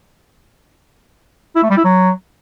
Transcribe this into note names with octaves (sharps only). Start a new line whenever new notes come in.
E4
A3
G3
E4
F#3